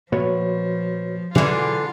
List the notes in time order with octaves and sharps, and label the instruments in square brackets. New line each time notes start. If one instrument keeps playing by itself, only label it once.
[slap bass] A#2 A3 A#3 [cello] F3 [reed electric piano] F#4 B4 C#5
[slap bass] B2 G#3 [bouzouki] D3 E3 [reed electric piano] F#3 G#4 F#5 [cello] F4